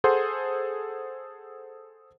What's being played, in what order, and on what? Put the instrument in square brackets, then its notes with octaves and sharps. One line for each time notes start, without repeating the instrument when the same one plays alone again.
[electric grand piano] G#4 A4 C5 F#5 C6 G6